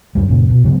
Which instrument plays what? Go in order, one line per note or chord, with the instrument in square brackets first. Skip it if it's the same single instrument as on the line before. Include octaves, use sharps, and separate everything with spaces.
[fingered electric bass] G1 F#2 G3
F#2 A#2 C#3
B2
G2 C#3 F#3 B3